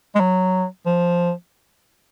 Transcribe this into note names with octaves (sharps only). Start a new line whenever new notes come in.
G#3
F#3
F3